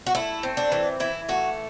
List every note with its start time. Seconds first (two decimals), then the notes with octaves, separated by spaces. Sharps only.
0.07 F#4
0.15 A3 E4
0.43 C4
0.57 D4
0.72 E3
1.00 E3 E4
1.29 A3 F#4